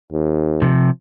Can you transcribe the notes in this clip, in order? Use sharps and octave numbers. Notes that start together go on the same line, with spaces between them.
D#2
C3 F3